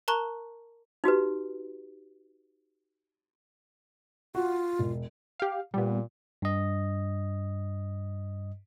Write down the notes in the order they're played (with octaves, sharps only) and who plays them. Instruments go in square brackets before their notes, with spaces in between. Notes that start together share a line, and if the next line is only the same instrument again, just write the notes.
[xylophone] A#4 A5 A#5 C#6 F#6 G7
[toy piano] D#4 F#4 G4 B4
[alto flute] F4 [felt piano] F#4
[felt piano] E1
[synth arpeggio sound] G4 F5
[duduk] A#2 [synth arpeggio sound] G3 B3
[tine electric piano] G2 D#5